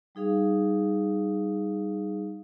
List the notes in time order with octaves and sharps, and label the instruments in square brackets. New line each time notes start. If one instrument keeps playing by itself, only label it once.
[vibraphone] G3 D#4 G#4 F5 D#6